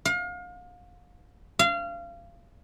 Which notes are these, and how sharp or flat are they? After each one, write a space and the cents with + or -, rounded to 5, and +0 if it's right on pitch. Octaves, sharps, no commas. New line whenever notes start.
F5 +35
F5 -25